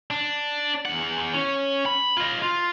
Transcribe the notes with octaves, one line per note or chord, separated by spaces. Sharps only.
D4
E2 F#5
C#4
B5
F4 D#5
F4